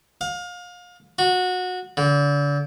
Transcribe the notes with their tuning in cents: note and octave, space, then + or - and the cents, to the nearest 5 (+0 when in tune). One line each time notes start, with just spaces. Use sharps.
F5 +30
F#4 -20
D3 -35